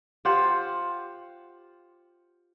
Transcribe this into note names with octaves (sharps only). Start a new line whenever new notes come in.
F4 G4 C5 F#5